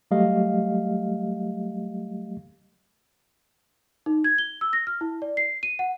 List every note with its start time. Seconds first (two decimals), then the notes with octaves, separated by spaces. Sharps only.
0.11 F#3 G3 A3 G4 D#5 F5
4.06 D#4
4.24 G#6
4.38 G7
4.61 E6
4.73 A#6
4.87 F6
5.01 E4
5.22 D5
5.37 C7
5.63 D#7
5.79 F#5